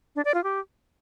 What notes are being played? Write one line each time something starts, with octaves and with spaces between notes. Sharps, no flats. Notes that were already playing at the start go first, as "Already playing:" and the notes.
D4
D5
F4
G4